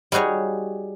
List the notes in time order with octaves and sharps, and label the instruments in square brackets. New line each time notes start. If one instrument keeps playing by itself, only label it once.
[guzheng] G3 D#4 F#4 G#4 C#5